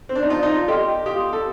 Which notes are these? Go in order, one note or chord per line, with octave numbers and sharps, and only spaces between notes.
C4
D4
D#4
F4 D5 A5 D#6
D#4
F4
G4 A4 D#5 G5 C6 F6
G4 F5 C6 D#6
A4